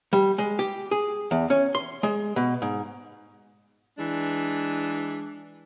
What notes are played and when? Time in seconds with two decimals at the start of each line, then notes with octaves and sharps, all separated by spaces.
0.13 G3
0.38 G#3
0.59 G4
0.91 G#4
1.31 E2
1.50 C#4
1.75 C6
2.03 G#3
2.36 B2
2.62 G#2
3.98 E3 G#3 D4